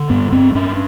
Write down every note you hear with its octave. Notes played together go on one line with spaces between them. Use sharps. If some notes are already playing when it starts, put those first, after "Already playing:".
Already playing: D3
G2 B3
G2 C4
G2 C#4